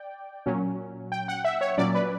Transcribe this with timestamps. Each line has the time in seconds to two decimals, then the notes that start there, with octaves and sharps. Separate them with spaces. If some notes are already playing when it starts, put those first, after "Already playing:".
Already playing: D5 G5
0.46 A#2 F#3 C#4
1.12 G5
1.28 F#5
1.45 E5
1.61 C#5
1.78 A#2 F#3 C#4 D5
1.95 B4